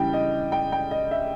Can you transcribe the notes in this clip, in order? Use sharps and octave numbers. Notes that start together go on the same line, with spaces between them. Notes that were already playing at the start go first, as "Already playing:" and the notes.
Already playing: C#3 E3 G3 G5
D#5
G5
G5
D#5
E5